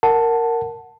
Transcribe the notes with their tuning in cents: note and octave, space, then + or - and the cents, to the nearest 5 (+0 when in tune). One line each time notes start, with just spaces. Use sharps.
A#4 -10 F#5 +0 A5 +0